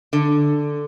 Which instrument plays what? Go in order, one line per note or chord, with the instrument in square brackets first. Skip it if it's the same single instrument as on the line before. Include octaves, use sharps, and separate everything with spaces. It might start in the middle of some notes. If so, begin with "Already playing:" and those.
[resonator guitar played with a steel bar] D3